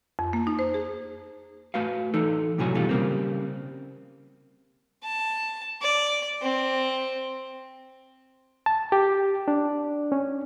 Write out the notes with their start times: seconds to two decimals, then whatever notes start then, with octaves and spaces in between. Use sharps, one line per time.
0.19 F2
0.33 A#3
0.47 D#4
0.59 C5
0.74 G#4
1.74 A3 F#4 B4 F5
2.14 E3 D#4 A4
2.58 A2 C3 E3 F#3 F#4 G#5
2.75 B2 D#3 G3 F4 A4
2.89 C#3 G3 A#3 C4
5.03 A5
5.82 D5
6.42 C4
8.66 A5
8.92 G4
9.48 D4
10.12 C#4